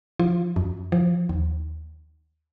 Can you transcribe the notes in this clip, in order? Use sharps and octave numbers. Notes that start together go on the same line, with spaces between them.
F3 F4
F#2
F3
D#2